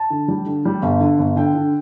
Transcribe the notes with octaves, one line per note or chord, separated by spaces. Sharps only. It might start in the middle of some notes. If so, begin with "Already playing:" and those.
Already playing: A5
D3
G3
D3
G3
G1
D3
G1
D3 G5
D3